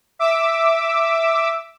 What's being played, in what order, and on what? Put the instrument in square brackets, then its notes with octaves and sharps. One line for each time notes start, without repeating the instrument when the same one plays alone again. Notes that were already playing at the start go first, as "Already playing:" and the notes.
[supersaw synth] E5 D6 E6